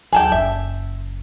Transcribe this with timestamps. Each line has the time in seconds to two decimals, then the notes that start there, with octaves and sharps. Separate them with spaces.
0.12 D#2 F#3 G#4 A4 G5
0.32 F#1 E5